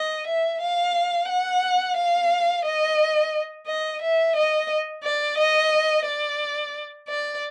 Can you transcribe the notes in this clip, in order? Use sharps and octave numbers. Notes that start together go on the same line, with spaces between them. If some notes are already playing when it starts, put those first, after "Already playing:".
Already playing: D#5
E5
F5
F#5
F5
D#5
D#5
E5
D#5
D5
D#5
D5
D5